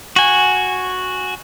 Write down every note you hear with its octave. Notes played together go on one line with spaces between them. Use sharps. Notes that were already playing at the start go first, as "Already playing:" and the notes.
F#4 G#5